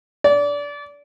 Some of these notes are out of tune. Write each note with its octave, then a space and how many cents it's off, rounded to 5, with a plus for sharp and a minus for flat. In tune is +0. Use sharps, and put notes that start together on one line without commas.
D5 -25